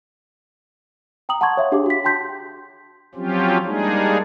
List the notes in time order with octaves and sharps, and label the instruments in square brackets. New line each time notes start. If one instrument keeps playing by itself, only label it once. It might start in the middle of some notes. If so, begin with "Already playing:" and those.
[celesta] G5 A#5 D#6 F#7
F#5 A5 A#5 C6 C#6 G#6
C#5 E5 F5
D4 G4 G#4 F5 D6
F#4 B6
G5 A5 C6 G6 B6
[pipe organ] F3 F#3 C4 C#4 F4 G4
G3 G#3 A#3 D4 D#4 G#4